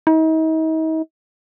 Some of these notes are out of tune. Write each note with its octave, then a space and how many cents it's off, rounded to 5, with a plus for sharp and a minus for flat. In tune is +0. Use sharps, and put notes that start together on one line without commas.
D#4 +40